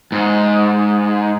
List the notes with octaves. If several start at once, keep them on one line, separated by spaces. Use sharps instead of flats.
G#2